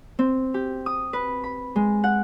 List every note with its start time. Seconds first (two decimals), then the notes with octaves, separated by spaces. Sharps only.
0.19 C4
0.54 G4
0.86 D#6
1.13 B4
1.44 B5
1.76 G#3
2.04 F#5